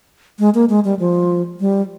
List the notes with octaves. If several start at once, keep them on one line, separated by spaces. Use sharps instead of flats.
G#3
A#3
G#3
G3
F3
G3